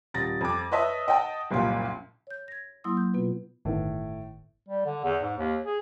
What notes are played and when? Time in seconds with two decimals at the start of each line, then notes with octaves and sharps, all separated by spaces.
0.14 D#1 A6 A#6
0.41 F2 D6
0.71 B4 C#5 D#5 E5 A5 D#6
1.08 D#5 F#5 G5 A5
1.51 F#1 C2 A#2 F3 F4
2.27 C#5 G6
2.48 G#6 A#6
2.84 F#3 A#3 E4 C6 D#6 E6
2.97 G6
3.14 B2 B3 F4 B4
3.65 G1 A2 D#3 B3
4.68 G3
4.85 D3
5.04 E2
5.22 G#2
5.38 D#2
5.65 G#4